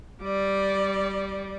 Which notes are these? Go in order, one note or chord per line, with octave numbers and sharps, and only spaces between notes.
G3 D5